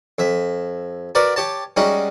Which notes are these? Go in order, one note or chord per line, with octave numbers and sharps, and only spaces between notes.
F2 E5
F#4 A#4 B4 D5
G4 C#5 A5
G3 G#3 C#4 D#4 F#4